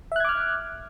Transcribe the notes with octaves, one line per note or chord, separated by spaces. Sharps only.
E5 D6 F6 F#6 G#6